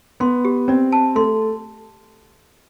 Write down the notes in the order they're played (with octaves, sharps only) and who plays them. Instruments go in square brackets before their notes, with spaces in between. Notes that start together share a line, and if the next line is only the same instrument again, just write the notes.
[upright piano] B3 [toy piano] C6
[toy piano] G4
[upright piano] C4 [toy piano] D5
[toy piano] A5
[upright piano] A3 [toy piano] C6